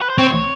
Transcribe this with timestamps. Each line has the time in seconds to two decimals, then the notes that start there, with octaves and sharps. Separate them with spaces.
0.02 B4
0.10 C5
0.18 C4 C#5